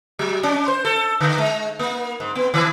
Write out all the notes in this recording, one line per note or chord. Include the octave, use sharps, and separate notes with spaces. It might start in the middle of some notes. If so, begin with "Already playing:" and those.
F#3
C#4
C5
A4
D3
G#3
A#3
G#2
B3
D#3